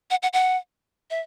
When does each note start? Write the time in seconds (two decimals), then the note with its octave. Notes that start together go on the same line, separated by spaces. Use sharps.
0.11 F#5
0.23 F#5
0.33 F#5
1.10 E5